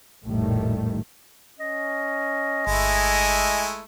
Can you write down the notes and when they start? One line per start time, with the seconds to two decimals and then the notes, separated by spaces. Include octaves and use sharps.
0.25 F1 A#1 A2 D#3 G3 A3
1.60 C#4 D#5
2.67 G1 G#3 A3 E4 G#5